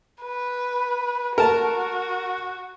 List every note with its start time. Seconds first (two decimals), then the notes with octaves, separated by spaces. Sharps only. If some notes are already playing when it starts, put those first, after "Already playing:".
0.22 B4
1.38 F#4 A#4 A5